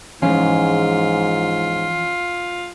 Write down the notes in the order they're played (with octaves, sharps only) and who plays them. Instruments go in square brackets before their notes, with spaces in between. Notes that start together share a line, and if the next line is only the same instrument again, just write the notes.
[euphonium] G#2 [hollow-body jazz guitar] E3 F3 G#3 [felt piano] C#4 [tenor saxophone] F4